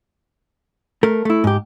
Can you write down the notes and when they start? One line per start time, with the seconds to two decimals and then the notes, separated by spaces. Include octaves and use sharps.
1.03 A3 A#4
1.25 A3 E4
1.44 G#2 G4